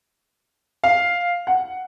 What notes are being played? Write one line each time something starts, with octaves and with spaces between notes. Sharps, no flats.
F5
F#5